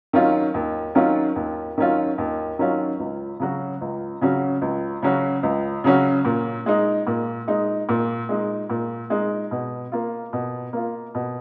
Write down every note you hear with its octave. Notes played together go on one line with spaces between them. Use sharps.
D#3 F#3 C#4 F4
D#2
D#3 F#3 C#4 F4
D#2
D#3 F#3 C#4 F4
D#2
D#3 F#3 C#4 F4
C#2
C#3 F#3 C#4 F#4
C#2
C#3 F#3 C#4 F#4
C#2
C#3 F#3 C#4 F#4
C#2
C#3 F#3 C#4 F#4
A#2
G#3 D#4
A#2
G#3 D#4
A#2
G#3 D#4
A#2
G#3 D#4
B2
A#3 F4
B2
A#3 F4
B2